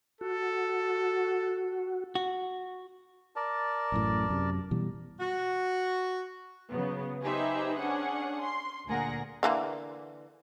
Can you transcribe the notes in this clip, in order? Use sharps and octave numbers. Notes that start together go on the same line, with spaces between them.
F#4 A4
F#4
A#4 D5 A5
A1 F#2 A2
F#2 C3
B2 E3 G3
F#4
C#3 F#3 B3
D#4 G4 G#4 B4 C5 E5
C#4 D4 G#4 F#5
C6
D2 A#2 G#4 A#4 F#5 A#6
D3 E3 A#3